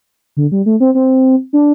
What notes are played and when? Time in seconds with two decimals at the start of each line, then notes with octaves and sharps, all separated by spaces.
0.37 D3
0.52 G3
0.66 A3
0.80 C4
0.95 C4
1.53 D4